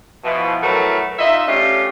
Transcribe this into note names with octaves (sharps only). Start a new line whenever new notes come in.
B2 E3 F3
A2 E3 F#3 A3 A#4 B4
D#4 F4 D#5 E5
A3 C#4 D4 F4 G4